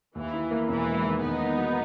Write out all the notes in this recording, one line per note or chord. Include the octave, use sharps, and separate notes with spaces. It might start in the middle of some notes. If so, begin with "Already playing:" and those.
D#2 E3
E4
A#3
E1 E3
G#3
D#3
E2 B3 D#4
A#3
F#3